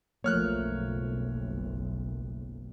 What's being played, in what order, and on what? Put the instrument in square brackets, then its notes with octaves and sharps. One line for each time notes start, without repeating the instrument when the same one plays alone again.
[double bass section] F#1 B1 [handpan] F3 A3 A#3 [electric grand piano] C#5 F6 F#6